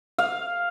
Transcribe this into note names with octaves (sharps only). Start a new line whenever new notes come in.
F5